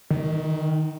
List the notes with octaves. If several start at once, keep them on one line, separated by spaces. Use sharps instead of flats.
D#3